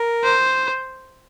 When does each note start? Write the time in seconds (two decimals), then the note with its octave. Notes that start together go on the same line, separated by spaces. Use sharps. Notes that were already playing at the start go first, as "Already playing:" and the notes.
Already playing: A#4
0.24 C5